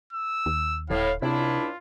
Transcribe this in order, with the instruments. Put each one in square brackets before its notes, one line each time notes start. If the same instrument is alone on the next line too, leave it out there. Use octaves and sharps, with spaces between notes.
[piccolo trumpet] E6
[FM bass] D#2
[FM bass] D#1 [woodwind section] A2 [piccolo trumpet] F5
[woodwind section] C#2 D4 E4 [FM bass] C3 [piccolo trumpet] F4